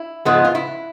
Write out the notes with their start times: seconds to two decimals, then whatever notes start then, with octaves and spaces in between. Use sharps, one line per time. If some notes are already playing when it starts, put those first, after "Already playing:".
Already playing: E4
0.25 G#2 F3 G#3 B3
0.44 F4
0.55 E4